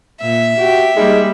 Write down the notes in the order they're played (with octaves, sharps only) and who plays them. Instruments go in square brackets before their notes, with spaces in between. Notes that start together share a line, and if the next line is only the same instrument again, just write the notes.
[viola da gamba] A#2 [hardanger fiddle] E5
[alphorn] F#4 [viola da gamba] G4
[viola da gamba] G3 A#3 [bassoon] G#3 [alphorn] D#4